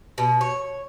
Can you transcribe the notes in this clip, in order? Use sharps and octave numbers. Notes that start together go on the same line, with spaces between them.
B2
C#5